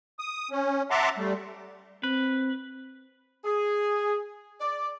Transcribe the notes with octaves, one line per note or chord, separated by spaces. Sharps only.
D#6
C#4
E5 F#5 A5 A#5 C6 D6
G3 A3
C4 B4
G#4
D5